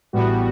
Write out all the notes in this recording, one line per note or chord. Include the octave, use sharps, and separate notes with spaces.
A1 A2 G3 B3 F#4